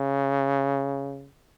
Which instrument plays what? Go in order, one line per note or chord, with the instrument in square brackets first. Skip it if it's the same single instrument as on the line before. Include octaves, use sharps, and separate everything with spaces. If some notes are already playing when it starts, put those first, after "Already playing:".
Already playing: [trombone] C#3